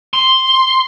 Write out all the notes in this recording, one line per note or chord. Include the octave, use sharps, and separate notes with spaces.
C6